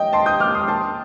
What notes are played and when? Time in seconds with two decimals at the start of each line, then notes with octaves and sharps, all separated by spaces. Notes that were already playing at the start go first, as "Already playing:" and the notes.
Already playing: D#5 G5
0.13 A5 C6
0.26 D#6 G6
0.40 D6 F6
0.55 C6 D#6
0.67 A5 C6